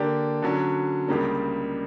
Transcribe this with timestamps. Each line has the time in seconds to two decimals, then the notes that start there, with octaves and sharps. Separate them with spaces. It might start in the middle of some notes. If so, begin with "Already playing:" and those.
Already playing: D3 A#3 D4 G4
0.42 D3 F#3 C#4
1.08 C#2 C#3 G3 A#3 D4